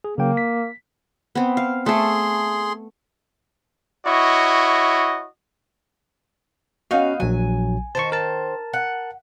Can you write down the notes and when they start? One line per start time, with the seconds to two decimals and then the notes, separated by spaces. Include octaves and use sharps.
0.04 G#4
0.18 C#3 F#3 A#3 G5
0.37 B6
1.35 B3 C4
1.57 F5
1.86 A3 G#4 A4 C6
4.06 E4 F#4 C#5 D#5
6.91 B3 C#4 D#4 F#4 F5
7.20 A#1 F#3 G#5
7.95 D#3 C5 A5 C#6
8.12 A#4 A5
8.73 F#5